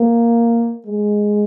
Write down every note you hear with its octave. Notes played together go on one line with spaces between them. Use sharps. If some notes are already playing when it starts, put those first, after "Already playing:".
Already playing: A#3
G#3